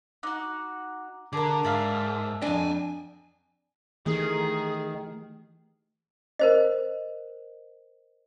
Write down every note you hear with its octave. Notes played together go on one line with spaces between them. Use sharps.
D#4 F#4 D6 F#6
D3 G#4 A#4 A5 A#5 D6
G#2 D5 E5 F5
F2 D4 G5 G#5
D#3 E3 A3 G4 G#4
A#4 C5 D#5